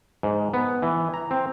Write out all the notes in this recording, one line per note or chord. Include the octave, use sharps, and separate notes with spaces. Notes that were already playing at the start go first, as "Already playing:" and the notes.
G#2
B3
E3
A#5
C4